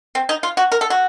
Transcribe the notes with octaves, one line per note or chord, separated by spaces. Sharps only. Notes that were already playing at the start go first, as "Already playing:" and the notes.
C4
D#4
F4
F#4
A#4
A4
F#4